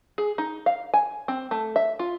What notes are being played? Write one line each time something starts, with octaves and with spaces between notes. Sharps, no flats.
G#4
D#4
F5
G#5
C4
A3
E5
F4